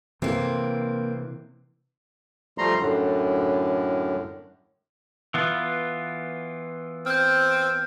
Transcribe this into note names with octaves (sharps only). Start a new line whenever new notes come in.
C3 E3 A#3 C4
F3 G3 A3 A#5 C6
F#2 A2 D3
E3 B3 F4
C4 F6 G6